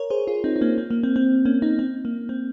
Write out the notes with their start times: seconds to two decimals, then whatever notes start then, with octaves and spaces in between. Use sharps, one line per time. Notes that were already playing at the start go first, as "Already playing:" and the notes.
Already playing: A#4 C#5
0.10 G#4 C5
0.27 F4 G#4
0.44 C4 D#4
0.56 D#4
0.61 A#3 C#4
0.78 C4
0.90 A#3
1.03 C4
1.16 C4
1.45 A#3 C#4
1.62 C4 D#4
1.79 C4
2.05 A#3
2.29 C4